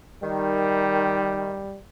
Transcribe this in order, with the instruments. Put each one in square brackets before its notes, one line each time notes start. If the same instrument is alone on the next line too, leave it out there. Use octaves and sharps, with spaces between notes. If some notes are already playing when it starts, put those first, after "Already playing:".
[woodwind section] D#3 [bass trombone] G3